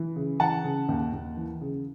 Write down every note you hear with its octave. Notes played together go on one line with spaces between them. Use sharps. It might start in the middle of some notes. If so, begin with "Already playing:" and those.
Already playing: E3
C#3
E3 F#5 A5
C#3
D#2
D#2
E3
C#3